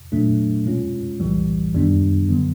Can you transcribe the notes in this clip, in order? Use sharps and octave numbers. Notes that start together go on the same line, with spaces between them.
A#2 F#3 A3 D4
B2 G#3 C#4 F4
B1 A2 E3 G3
F#2 D#3 G3 B3 D4
D3 F#3 B3